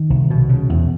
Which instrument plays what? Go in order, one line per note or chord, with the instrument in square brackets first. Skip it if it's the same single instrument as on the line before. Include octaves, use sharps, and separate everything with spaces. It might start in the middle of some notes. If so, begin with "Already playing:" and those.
Already playing: [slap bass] D#3
C2
B2
C#3
E2